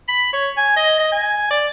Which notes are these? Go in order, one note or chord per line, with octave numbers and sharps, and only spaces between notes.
B5
C#5
G#5
D#5
D#5
G#5
D5